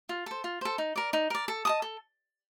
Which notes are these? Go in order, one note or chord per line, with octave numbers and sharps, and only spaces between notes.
F4
A4 C5
F4
A4 C5
D#4
A#4 D5
D#4
A#4 D5
A4
D#5 A5 D#6
A4